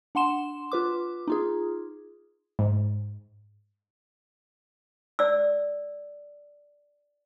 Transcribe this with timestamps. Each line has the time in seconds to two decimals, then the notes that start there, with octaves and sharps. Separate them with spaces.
0.15 D4 F#5 C6 E7
0.72 F4 B4 D6
1.28 D#4 F4 G#4
2.59 G#2
5.19 D5 E6